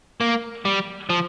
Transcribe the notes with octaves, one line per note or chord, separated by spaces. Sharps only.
A#3
G3
F3